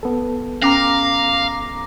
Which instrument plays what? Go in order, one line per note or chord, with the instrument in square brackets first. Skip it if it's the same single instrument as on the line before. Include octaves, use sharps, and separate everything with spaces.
[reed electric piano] B3 A4
[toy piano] C#4 [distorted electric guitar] F5 [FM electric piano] A#5 D6 A#6